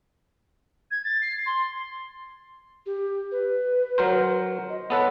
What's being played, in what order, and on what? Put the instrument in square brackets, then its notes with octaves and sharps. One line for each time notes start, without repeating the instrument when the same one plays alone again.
[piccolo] G#6
A6
C7
C6
[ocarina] G4
B4
[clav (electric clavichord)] F#3 A#4 C5
[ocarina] D#5
[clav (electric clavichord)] B3 A4 B4 [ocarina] C#5